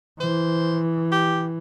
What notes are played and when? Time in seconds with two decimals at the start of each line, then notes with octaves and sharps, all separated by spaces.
0.20 E3 C5
1.12 G4